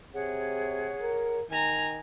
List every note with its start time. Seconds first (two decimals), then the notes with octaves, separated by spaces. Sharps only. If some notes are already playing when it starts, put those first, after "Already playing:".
0.13 C3 G#4 C#5 F#5
1.01 A#4
1.50 D#3 G#5 A#5